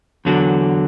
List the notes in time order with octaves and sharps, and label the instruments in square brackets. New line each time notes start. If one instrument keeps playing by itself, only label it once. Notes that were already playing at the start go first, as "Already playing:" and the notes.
[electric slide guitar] E2 D3 F#3